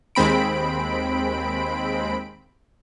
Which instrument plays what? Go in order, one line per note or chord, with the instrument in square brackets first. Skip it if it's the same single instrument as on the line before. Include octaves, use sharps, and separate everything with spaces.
[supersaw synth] D#2 G#3 C4 B5 D7